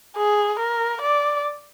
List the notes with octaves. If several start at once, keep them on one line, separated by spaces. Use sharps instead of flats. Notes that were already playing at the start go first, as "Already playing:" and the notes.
G#4
A#4
D5